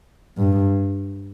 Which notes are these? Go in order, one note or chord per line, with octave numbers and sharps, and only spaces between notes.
G2